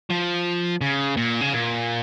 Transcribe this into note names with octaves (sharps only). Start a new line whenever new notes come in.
F3
C#3
A#2
C#3
A#2